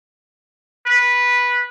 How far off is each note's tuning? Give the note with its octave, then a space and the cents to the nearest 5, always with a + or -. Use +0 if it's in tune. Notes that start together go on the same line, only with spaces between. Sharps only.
B4 -10